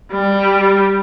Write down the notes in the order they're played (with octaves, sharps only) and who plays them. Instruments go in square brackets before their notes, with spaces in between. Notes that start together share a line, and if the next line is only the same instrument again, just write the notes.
[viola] G3